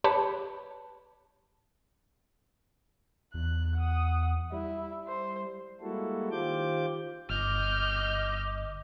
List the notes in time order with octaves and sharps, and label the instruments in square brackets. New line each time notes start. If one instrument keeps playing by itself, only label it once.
[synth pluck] G4 B4 C#5 A5 B5
[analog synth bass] E2 [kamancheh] F#6
[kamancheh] F#5 D#6
[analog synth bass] G3 [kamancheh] E4
[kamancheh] C5
[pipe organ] G3 G#3 A#3 E4 F#4 A4
D#3 F4 G4 C5 D6 G6
[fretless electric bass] G1 [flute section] D#5 D6 [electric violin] F6 G6